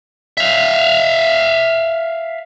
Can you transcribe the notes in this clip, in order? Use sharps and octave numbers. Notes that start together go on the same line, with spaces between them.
E5 F5